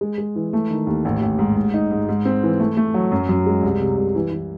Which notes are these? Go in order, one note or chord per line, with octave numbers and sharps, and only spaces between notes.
G#3
G#3
E3
A3
D#3
D#2
A1
A1
G#2
G#2
D#4
G#2
G#2
C4
E3
A3
A3
F#3
F#2
F#2
G#3
C2
C3
C2
E3
E3